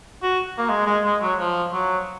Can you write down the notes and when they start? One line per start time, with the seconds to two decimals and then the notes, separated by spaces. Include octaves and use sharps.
0.23 F#4
0.58 A#3
0.69 G#3
0.86 G#3
1.04 G#3
1.21 F#3
1.38 F3
1.73 F#3